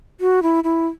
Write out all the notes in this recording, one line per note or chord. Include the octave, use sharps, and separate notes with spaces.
F#4
E4
E4